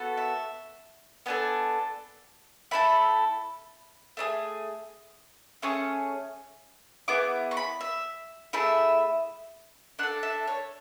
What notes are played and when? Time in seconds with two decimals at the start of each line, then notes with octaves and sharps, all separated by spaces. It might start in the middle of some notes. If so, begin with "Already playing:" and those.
Already playing: B3 F#4 A4
0.17 E5
1.26 B3 D4 A4 G#5
2.71 A3 E4 A4 B5
4.17 A3 D4 G#4
5.62 A3 C#4 G#4 C#6
7.08 B3 E4 G#4 D6
7.51 C#6
7.57 B5
7.81 E5
8.53 A3 E4 G#4 E5
9.99 D4 F#5
10.03 A4
10.23 E5
10.48 C#5